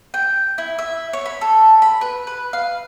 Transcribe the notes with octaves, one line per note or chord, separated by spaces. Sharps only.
G5
E4
E5
C#5
B5
A4
B5
B4
B4
F5